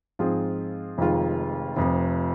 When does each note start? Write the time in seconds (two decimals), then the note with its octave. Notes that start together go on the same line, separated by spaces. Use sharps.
0.19 G#2 F3 C4 F4 G#4
0.98 F1 F2 D#3 G#3 F4
1.76 F1 F2 F3